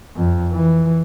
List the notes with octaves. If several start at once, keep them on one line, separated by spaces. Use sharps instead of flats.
F2
E3